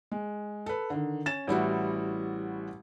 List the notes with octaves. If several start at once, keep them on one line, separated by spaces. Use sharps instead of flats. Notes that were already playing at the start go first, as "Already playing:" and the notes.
G#3
A4 B4
D3 D#3
C#4 A6 E7
A1 G3 E4 F#4